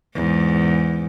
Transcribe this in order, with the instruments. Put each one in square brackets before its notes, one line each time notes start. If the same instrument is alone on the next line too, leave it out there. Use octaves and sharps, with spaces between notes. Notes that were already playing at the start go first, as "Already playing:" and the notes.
[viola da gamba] E2 G#2